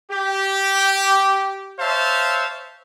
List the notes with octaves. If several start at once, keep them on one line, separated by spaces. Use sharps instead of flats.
G4
C5 C#5 E5 F5 A5